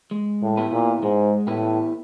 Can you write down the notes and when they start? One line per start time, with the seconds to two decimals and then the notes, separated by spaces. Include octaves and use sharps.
0.11 G#3
0.43 A2
0.57 B3 E4 G4 B4
0.72 A#2
1.03 G#2 G#3
1.47 A2 B3 E4 G4 B4